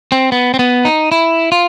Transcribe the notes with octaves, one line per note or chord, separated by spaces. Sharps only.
C4
B3
C4
B3
D#4
E4
F4